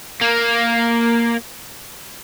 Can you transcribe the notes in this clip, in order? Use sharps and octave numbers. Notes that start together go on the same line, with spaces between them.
A#3